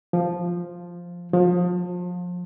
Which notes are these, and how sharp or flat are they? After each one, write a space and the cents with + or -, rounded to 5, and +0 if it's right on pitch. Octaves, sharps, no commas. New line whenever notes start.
F3 +0
F3 +30